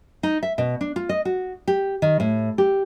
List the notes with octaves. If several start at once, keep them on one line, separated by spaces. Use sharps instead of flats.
D#4
E5
B2
D4
F4
D#5
F#4
G4
D#3
A2
G4